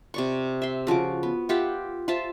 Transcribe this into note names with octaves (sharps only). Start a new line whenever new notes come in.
C3 D5 C#6
E5 C6
C#3 F3 F#4 D6
B3
F4 G4 E5 F#5
F4 C5 E5 A5